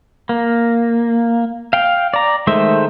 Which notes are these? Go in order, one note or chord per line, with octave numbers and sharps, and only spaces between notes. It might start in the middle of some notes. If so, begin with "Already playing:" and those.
A#3
F5 G5
D5 A#5
D#3 G#3 A3 C5 E5